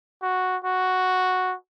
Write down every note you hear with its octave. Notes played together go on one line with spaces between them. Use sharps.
F#4
F#4